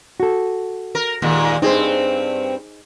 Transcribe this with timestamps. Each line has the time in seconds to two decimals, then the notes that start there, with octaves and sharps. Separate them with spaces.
0.20 F#4 A4
0.95 A#4
1.22 D#2 A#2 G#3
1.62 G2 C4 D#4 G#4 C5